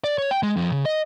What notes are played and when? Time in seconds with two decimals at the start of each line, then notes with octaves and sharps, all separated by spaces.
0.04 D5
0.18 C#5
0.31 G5
0.43 G#3
0.56 F2
0.72 C#3
0.86 D#5